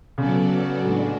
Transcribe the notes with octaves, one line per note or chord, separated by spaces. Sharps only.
C#3 F#3 B3 F#4 A4 D5
A2 G#3 D4 F#4